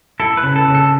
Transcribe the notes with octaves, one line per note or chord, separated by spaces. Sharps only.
E4 A4
B4
C#3
A4
C#3
A4